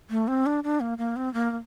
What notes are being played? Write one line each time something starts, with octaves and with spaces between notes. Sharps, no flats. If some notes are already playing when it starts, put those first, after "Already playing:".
A3
C4
D4
D4
A#3
A#3
C4
A#3
A#3